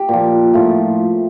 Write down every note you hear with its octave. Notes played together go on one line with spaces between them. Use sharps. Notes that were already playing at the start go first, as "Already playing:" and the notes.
Already playing: G4
A#2 F3
A2 F3